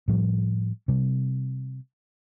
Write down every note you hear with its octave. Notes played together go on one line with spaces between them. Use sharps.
A2 F3 G3
C3 G3